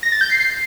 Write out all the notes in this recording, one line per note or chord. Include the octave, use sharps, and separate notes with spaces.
A#6
A6
G6
C7